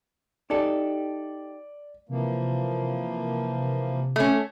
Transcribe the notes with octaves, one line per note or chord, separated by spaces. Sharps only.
D#4 G4 A4 D5
C3 E3 F3 A#3
A3 C#4